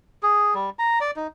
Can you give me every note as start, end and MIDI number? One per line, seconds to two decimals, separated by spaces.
0.23 0.54 68
0.54 0.70 55
0.79 0.99 82
1.01 1.11 74
1.16 1.27 63